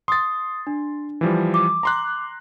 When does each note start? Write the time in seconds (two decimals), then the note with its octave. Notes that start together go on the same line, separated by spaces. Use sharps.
0.08 C6 D#6 A6
0.67 D4
1.21 E3 F3 G3
1.54 D6
1.83 A#5 C6 F#6